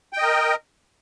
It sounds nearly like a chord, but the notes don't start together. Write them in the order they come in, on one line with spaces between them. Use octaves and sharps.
G5 D#5 A#4